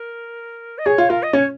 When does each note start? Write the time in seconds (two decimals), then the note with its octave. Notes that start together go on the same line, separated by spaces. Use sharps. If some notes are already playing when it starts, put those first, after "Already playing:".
Already playing: A#4
0.78 D#5
0.85 G#4 C#5
0.98 F4
1.09 F4 A#4
1.23 D#5
1.33 C#4 C#5